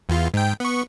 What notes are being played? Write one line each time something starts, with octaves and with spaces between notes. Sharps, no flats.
E2 F4
G#2 G5
B3 C#6